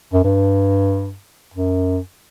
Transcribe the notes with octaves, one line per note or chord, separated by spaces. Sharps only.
F#2
G2
F#2